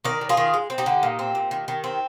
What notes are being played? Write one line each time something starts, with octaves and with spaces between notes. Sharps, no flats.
D#3 A#4 D5
D#3
F4 G#4
D#3
G#3
C4
D#4 G4
D3
A#2
C4
A#2
D#3
D#3
C4